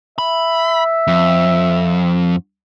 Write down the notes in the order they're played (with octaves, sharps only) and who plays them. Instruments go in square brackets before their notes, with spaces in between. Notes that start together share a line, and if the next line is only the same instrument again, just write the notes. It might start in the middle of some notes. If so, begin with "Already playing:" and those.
[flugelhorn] E5 [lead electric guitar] B5
[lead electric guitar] F2